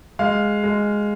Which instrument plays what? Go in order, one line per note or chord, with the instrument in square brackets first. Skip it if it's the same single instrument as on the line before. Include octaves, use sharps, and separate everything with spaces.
[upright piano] G#3 F5
G#3